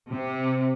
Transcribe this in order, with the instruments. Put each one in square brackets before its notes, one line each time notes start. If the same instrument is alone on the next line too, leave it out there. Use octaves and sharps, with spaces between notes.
[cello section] C3